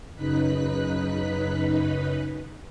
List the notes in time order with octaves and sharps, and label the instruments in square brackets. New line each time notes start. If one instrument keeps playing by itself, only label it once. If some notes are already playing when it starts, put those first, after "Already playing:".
[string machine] F#2 C#3 D#4 B4 F#6 B6